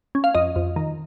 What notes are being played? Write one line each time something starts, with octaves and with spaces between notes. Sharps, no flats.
C#4
F5
F2 D#5
F2
D#3